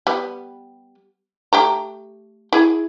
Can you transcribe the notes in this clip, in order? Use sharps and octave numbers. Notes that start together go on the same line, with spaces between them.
G3 B3
A3 G4 A#5
E4 G#4